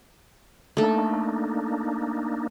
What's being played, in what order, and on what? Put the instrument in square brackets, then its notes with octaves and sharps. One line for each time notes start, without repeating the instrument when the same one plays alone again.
[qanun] A3 A4 [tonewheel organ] A#3 D4 D#4